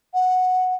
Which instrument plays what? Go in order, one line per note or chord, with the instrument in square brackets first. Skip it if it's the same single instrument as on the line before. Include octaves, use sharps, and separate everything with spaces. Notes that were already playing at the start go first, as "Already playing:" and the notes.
[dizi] F#5